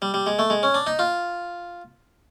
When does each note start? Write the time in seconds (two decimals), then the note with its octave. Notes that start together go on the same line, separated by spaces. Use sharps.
0.02 G3
0.14 G3
0.27 G#3
0.39 A3
0.50 G#3
0.63 C#4
0.74 D4
0.87 D#4
0.99 F4